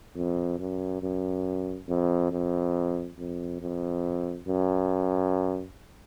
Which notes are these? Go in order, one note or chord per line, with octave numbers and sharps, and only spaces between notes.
F2
F#2
F#2
F2
F2
F2
F2
F#2